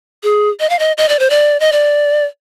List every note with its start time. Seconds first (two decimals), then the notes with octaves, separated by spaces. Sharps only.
0.23 G#4
0.60 D#5
0.70 F5
0.79 D#5
0.98 D#5
1.09 D5
1.19 C5
1.30 D5
1.60 D#5
1.72 D5